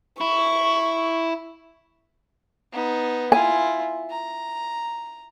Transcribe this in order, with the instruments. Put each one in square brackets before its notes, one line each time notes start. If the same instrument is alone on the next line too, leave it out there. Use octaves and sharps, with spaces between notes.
[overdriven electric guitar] E4 [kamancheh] C#6
[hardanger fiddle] B3 D#4
[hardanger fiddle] E4 F4 [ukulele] G#5
[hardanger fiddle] A#5